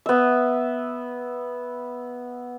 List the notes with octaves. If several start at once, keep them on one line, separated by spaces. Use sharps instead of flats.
B3 E5